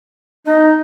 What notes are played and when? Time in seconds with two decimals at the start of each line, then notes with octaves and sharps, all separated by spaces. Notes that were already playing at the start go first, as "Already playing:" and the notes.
0.47 D#4 D#5